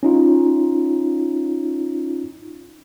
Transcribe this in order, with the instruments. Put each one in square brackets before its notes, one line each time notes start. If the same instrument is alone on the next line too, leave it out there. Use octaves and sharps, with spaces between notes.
[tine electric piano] C#4 D#4 F4